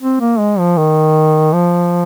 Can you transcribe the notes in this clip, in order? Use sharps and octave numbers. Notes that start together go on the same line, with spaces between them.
C4
A#3
G#3
F3
D#3
F3